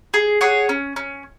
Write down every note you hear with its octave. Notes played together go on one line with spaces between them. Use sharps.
G#4
G#4 C#5 F#5
C#4
C#4